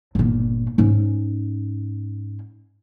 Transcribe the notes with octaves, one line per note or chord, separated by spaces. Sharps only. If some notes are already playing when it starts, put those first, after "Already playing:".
G1 A#2
G#2 C#4